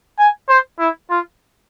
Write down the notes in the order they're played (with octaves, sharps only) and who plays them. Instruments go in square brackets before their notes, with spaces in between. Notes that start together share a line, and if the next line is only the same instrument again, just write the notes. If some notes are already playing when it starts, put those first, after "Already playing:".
[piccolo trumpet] G#5
C5
E4
F4